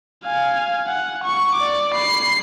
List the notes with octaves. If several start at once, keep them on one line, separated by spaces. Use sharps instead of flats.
F5 G#5
F#5
C#6
D5 D6
B5 C7